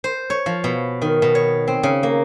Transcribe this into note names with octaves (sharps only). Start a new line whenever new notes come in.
C5
C#5
F3
B2
D#3
B2
C#5
C4
C#3
A#3